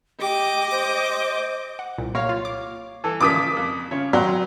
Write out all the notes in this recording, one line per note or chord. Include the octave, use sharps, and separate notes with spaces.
G4 D#5 D6
C5
F#5
C2 A#2
A#3 C#5 F5
F4
D6
E3 A4
C#3 F3 A#3 D6 D#6 B6
F2
C#3 F4 C#5
F#3 G4 C6